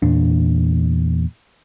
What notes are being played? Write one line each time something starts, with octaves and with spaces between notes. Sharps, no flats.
E2 A#2 D4